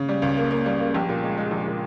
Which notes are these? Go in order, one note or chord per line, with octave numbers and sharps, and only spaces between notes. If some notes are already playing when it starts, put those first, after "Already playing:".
Already playing: C#3
G3
C#2
A#3
A#3
G3
A#3
A#1 G4
A#2
G#3
G#3
A#1
A#2